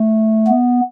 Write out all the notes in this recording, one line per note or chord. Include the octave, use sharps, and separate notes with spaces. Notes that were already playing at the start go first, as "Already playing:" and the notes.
Already playing: A3
B3